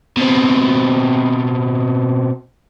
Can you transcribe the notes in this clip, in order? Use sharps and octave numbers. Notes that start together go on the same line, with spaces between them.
B2 C4